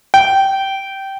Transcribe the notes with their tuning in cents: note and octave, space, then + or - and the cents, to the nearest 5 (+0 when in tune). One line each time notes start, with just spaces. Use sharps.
G5 -15